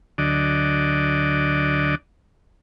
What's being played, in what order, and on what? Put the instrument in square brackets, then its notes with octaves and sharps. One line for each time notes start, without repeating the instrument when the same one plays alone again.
[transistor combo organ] D2 D3 F#3 D5 D#5